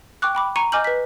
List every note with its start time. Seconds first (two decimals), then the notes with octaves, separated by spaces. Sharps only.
0.22 G5 C#6 D6 F#6
0.35 G5 B5 D6
0.56 A#5 C#6 C#7 D#7
0.72 D#5 G#5 D6 F6 G6 F#7
0.84 B4 B6